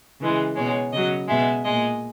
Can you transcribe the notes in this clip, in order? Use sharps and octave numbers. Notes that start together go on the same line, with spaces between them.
C#3 E3 G#3
B2 G#3 C#5
C#3 F#3 D#5
B2 G#3 E5
A#2 G#3 D#5